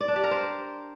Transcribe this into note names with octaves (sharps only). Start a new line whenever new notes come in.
D5
D4
G4
A#4
C5